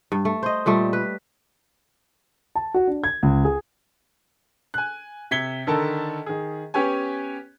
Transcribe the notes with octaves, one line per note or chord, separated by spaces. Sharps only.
G2
A3
C5 D#5
A#2 G3 A3
B4
A5
F#4
D4
G#6
C#2
G#4
G#5 F#6
C3 G#6 B6 C#7 G7
D3 D#3 A4 A#4 A5
D#3 G#4
B3 C#4 G4 B4 C#5 G#5